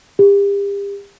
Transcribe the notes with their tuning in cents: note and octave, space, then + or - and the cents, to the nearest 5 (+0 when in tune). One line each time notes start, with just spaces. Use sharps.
G4 +35